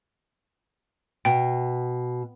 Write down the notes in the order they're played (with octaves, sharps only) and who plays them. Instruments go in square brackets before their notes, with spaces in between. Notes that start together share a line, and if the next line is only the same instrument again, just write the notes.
[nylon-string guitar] B2 [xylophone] G5